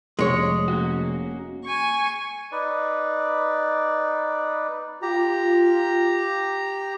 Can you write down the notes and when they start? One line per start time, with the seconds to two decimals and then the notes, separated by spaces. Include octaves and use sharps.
0.19 F1 G#3 C#5
0.68 A#3 C#4 F#4
1.65 G#5 C#6
2.52 D#4 B4 D5
5.02 F4 G4 A#5